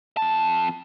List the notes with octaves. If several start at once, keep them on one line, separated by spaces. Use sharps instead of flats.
F2 A5